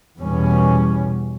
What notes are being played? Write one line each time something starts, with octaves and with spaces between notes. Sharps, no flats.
E2 B2 G3 C#4